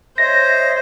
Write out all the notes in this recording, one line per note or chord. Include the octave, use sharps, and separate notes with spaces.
C5 C#5 D#5 E5 A#6